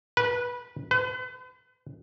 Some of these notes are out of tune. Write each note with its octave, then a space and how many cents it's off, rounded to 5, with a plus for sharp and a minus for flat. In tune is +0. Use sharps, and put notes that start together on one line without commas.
B4 -20
B4 +40